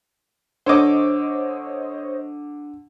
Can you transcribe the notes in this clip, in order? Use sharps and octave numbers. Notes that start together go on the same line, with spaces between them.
D3 C5 C#5 D#5 D6